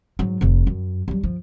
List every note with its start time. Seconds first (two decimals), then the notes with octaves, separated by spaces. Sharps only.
0.19 G#2 F#3
0.41 F1 C3
0.67 F#2
1.08 G2 F#3
1.23 F3